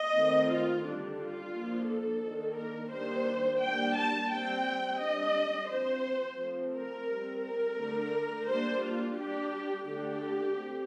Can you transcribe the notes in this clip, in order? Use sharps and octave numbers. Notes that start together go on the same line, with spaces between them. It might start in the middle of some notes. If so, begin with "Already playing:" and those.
Already playing: D#5
D#3 A3 C4
F4
D3 G3 D4
F4
F3 A#3 D4
A4
D#3 A#3 D4
A#4
D#3 G3 A#3 D4 C5
G3 A#3 D4 G5
A5
G3 C4 G5
G3 D4 D#5
F3 C4 C5
F3 A3 C4
A#4
G3 C4
A#4
D3 A3 D4
G3 A#3 D4 C5
F4
G3 D4 G4
D3 A3 D4 G4
A3 C4